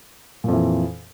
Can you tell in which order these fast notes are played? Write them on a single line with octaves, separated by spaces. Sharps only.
A#2 F2 E3